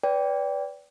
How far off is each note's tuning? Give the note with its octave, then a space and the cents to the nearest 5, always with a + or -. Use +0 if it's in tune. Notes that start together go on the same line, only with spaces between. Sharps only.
B4 +10 D5 -30 G5 +0